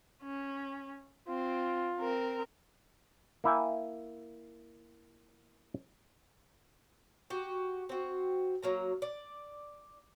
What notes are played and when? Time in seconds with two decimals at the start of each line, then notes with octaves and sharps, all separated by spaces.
0.23 C#4
1.28 C4 F4
2.00 C4 A#4
3.44 A#3 E4 G5 G#5
7.30 F#4 G4
7.89 C4 F#4
8.62 F#3 A#3 A#5
9.02 D5